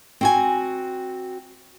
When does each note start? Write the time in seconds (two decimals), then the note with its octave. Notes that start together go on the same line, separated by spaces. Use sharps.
0.21 C4 F#4 G#5